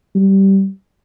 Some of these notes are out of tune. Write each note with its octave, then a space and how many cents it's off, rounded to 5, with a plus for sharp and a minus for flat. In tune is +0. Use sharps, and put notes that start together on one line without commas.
G3 -15